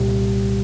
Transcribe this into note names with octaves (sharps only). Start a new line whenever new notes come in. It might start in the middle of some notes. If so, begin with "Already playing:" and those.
Already playing: C2 A#2 G3 G4